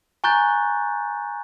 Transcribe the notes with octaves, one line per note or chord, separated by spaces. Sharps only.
G#5 A#5 C#6 F#6 G6 A6